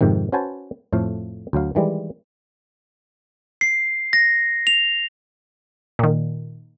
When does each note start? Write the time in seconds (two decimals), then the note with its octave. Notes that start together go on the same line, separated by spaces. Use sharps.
0.01 F2 G#2 C3 D#3
0.32 C#4 F#4 B4 C5 G#5 A5
0.93 F2 A2 F3 A3 F5
1.53 D2 F#3 F5
1.75 D#3 E3 G3 G#3
3.61 C7
4.13 A#6
4.67 F7
5.99 A#2 D#3